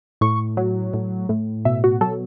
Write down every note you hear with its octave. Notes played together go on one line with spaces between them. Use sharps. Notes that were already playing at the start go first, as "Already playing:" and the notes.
A2 C#6
F#3
A2
A2
B2 E5
F#4
F#3 A4